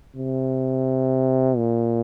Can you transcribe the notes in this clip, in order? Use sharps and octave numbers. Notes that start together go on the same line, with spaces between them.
C3
A#2